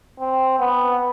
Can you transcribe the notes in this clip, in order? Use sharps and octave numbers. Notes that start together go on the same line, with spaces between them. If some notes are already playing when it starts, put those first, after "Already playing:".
C4
B3